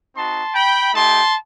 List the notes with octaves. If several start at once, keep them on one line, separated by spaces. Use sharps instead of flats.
C4 D#4 F#4 A5 C6
G5 B5
A3 D#4 G4 A5 C6